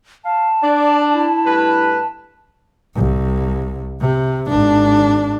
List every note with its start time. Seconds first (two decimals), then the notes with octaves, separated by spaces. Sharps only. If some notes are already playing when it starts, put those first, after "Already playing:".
0.25 F5 A5
0.63 D4 D5
1.14 E4
1.45 G2 A3 B4
2.95 C2
4.01 C3
4.48 G#1 D4